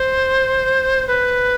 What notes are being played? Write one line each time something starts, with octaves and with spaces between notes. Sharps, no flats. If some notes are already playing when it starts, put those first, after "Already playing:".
Already playing: C5
B4